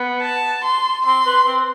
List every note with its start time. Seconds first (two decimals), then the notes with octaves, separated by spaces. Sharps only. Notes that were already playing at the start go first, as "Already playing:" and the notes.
Already playing: B3
0.22 A5
0.64 C6
1.05 C4 C6
1.26 B4
1.46 C4